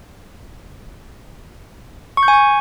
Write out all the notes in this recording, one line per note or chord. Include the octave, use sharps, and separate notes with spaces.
C#6
G6
G#5
C#6